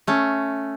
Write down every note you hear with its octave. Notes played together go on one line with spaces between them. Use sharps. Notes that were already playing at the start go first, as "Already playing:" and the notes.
A3 C#4